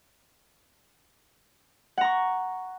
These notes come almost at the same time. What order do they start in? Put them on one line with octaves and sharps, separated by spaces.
F#5 A#5 C#6